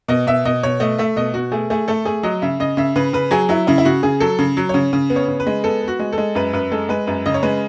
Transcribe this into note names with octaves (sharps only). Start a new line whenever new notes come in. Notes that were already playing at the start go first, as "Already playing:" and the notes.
B2 D#5
B2 E5
B2 D#5
B2 C#5
A3 D#5
A3 E5
B2 D#5
B2 F#4
A3 G#4
A3 G#4
A3 A4
A3 G#4
F#3 D#5
C#3 E5
C#3 D#5
C#3 E5
C#3 B4
C#3 B4
F#3 G#4
F#3 E4
C#3 E4
E4
C#3 F#4
C#3 G#4
F#3 A4
C#3
F#3
C#3 C#5
C#3
B3
C#5
C#3
B4
G#3
B3 A4
B3
F#4
G#3
A4
G#3
F#2 B4
F#2 B4
G#3 A4
G#3 B4
F#2 B4
C#3 D#5
C#5
G#3 B4